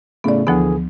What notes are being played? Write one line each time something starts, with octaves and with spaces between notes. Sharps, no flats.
A2 C#3 A3 B3 D5
D2 D3 E3 F3 B3 G#4